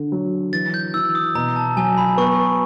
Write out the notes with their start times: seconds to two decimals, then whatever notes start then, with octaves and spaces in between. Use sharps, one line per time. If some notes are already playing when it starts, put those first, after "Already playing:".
Already playing: D3
0.12 F#3
0.53 E3 A6
0.74 G6
0.94 E3 E6
1.15 D#6
1.35 B2 A#5
1.56 A5
1.77 F#3 G#5
1.98 B5
2.18 B3 C#6